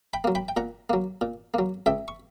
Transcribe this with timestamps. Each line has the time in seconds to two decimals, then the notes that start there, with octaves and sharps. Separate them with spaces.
0.13 G5 B5
0.24 F#3 A#3
0.35 G5 B5
0.48 G5
0.57 A#2 F#5 A#5
0.90 F#3 A#3
1.21 A#2
1.54 F#3 A#3
1.86 C#2 E5 G5
2.08 C#6